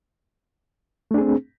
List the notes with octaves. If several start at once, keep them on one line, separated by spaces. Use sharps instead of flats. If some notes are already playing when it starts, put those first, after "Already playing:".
A3 C4 D4 G#4